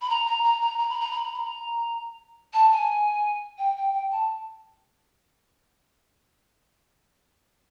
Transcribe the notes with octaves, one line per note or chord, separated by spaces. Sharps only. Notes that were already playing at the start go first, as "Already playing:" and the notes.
B5
A#5
A#5
A#5
A#5
A#5
B5
A#5
B5
A#5
B5
A#5
A5
G#5
G5
G5
G5
A5